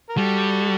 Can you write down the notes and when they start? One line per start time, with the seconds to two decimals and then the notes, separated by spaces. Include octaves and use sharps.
0.09 A#4
0.17 G3 F#4 A4